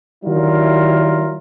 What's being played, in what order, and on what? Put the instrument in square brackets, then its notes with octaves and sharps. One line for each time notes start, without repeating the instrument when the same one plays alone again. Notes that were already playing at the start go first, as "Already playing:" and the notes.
[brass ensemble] D#3 F#3 G3 E4 F4 A#4